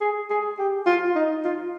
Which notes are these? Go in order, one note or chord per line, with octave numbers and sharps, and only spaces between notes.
G#4
G#4
G4
F4
D#4
F4